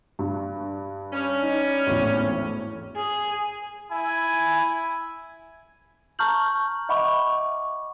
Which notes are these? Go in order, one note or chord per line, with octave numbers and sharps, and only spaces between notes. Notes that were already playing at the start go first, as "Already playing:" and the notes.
G2
G3 C#4
D#4
G#1 E2 A2
G#4
E4 G#5
A5 A#5 C#6 F6 G6 F#7
D#5 E5 F#5 B5 C#6 D6